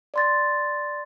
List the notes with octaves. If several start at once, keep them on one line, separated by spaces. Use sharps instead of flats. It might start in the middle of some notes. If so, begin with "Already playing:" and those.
D5 C6 A6